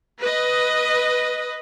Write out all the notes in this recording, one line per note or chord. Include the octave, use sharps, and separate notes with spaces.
B4 D#5